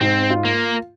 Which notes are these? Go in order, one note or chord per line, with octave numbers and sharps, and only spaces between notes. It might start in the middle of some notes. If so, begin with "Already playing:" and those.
G#2 C4
F4
A#3